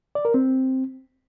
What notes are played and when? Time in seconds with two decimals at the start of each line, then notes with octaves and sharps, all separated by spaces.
0.15 D5
0.25 A#4
0.34 C4